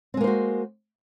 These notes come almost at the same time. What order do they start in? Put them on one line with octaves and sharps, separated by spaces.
C4 G#3 A#3 C5 F#4